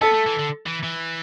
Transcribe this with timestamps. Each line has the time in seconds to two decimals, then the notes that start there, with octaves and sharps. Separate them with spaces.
0.01 B3 A4
0.14 A3
0.26 E3
0.39 D3
0.66 E3
0.83 E3